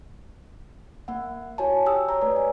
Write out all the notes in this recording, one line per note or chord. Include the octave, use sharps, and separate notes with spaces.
A#3 F#5
E4 F#4 C#5 G#5 A5
G4 G5 D#6 E6
C#5 A#5
A3 B4 D5
G#5